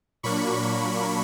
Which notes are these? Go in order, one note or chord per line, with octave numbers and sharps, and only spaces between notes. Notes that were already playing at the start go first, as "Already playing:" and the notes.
A#2 F#3 A#3 D4 B5 C#6